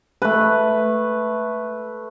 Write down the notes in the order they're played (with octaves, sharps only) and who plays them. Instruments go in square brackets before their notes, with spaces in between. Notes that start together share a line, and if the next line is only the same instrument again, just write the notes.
[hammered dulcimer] A3 B4